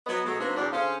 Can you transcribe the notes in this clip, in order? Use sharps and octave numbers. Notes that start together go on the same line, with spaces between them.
F#3 B3 D#5
B2 F#3 G#3 A3 B3
F#3 A#3 C4 D4 D#4 B4
E2 B2 F#3 D4 D5
D3 C#4 G#4 C5 F5